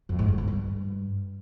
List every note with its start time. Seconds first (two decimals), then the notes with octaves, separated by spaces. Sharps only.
0.09 F2
0.19 G#2
0.28 G2
0.38 D#3
0.47 G2